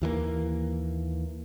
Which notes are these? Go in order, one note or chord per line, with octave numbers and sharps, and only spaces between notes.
D#2 E3 G3 A#3